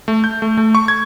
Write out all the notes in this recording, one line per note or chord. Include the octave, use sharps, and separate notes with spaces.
A3
G6
A3
A3
C#6
G#6